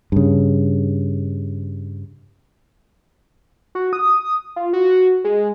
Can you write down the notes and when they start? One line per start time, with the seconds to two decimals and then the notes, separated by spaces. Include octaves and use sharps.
0.12 G2 C#3
3.75 F#4
3.93 D#6
4.56 F4
4.73 F#4
5.24 G#3